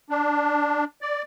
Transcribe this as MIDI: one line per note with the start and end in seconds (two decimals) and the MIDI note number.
0.10 0.84 62
1.02 1.22 74